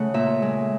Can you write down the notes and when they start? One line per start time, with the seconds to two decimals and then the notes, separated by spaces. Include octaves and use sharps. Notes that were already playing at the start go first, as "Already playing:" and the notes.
Already playing: C#3 A3 F#5
0.14 A#2 E5
0.42 G#3